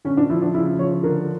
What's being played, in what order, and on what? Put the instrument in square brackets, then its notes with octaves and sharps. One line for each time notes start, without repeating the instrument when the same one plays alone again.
[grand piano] D3 [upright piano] C#4
[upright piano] D4
[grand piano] F3 [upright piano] E4
[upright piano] D4
[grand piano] C#3 [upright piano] E4
[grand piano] F3 [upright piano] C#5
[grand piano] D3 [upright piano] A#4